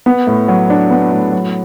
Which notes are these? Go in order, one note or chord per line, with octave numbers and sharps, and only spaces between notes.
B3
A2
F#3
D4
B3
A2
F#3